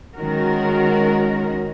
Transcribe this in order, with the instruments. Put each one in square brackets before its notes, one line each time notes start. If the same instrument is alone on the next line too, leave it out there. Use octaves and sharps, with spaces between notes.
[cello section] D#3 G#3 C#4 F#4 A#4